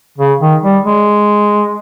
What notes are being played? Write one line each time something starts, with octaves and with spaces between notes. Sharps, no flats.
C#3
D#3
G3
G#3